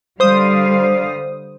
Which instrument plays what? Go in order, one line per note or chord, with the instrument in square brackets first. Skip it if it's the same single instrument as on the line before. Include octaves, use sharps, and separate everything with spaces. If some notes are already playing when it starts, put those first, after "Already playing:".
[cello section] D3 G3 F5 [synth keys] C5 D#6